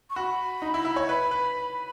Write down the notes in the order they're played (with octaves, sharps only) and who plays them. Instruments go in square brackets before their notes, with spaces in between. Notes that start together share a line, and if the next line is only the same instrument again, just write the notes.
[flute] C#6
[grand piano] F#4 [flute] B5
[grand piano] D#4
E4
E4
C#5
[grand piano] B4 [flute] B5
[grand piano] B4